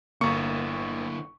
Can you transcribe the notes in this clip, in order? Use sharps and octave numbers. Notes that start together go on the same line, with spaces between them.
G1 D3 A#3 E4 C#6 C#7